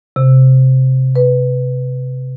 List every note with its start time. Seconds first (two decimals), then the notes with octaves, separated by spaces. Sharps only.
0.16 C3
1.16 B4